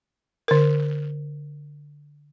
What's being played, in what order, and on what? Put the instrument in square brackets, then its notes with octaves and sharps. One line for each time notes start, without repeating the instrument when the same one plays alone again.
[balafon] D3 A#4